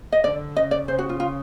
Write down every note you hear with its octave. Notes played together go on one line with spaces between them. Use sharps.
D#5
D3 D5
C#3 D#5
D5
C#3 C5
F#4
F4
F4